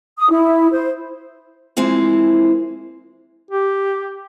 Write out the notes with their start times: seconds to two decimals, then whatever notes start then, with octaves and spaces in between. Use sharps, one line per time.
0.18 D#6
0.30 E4
0.72 C5
1.77 E3 F3 G#3 A#3 C4 E4
3.51 G4